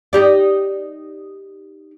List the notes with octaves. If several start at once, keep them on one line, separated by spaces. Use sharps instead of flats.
D#4 G4 D5